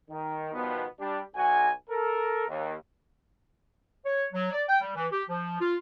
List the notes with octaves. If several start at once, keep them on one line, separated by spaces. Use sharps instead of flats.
D#3
B2 D#3 F3 G3 B3
G3 D4 G4
B1 F#4 G#5
A4 A#4
D#2
C#5
F#3
D5
G5
G3
E3
G4
F3
F4